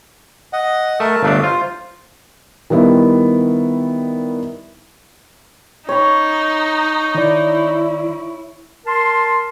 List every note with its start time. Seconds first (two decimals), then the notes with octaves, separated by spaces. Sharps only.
0.53 D#5 F#5
1.00 A3 A#4 A5
1.23 G1 A3 D4 F5
1.43 F4 C5
2.70 D#3 G3 B3 E4
5.89 D#4 C#5 B5
7.15 D#3 E4 D5
8.86 A#4 A5 C6